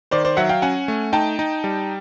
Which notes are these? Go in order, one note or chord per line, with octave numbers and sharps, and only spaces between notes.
D#3 C5 D5
C5 D5
F#3 E5 F#5
F5 G5
C#4 F#5 G#5
A3
D#4 G5 A5
D#4
G3